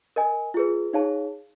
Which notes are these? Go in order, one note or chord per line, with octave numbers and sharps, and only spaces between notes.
A#4 D#5 G#5
F4 G#4 B4
D#4 G#4 C#5 F5 A5